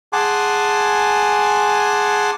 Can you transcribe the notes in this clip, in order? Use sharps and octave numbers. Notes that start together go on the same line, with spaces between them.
G#4 F#5 G#5 A5 C6 D6